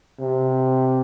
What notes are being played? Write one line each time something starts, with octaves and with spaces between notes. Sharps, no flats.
C3